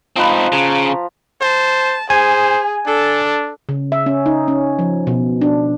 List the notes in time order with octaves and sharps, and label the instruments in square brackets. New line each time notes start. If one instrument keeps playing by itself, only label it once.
[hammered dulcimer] F3 B4 [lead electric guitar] C4 D#4
[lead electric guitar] C#3 [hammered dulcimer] A#5
[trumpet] C5 [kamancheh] A5
[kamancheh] G#4 [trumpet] C5 [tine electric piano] G#5
[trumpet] D4 [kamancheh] A4
[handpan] C#3
E5
C#4
D#4
C#4
F3
B2
D4